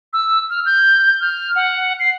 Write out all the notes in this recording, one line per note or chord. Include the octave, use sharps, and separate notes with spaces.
E6
F6
G6
F6
F#5
C7